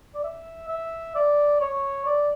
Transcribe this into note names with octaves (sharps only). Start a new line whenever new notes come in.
D5
E5
E5
D5
C#5
D5